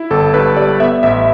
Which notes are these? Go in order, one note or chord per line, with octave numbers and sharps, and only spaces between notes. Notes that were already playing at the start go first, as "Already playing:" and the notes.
Already playing: E4
G1 A4
G2 B4
G3 D5
B3 E5
A1 E5